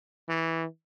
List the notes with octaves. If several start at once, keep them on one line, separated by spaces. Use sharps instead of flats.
E3